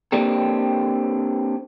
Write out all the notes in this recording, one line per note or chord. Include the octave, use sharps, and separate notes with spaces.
A#3 C4 D4 G4 A4